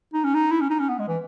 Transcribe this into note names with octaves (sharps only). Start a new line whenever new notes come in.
D#4
C#4
D#4
E4
C#4
D#4
C#4
B3
G#3
E3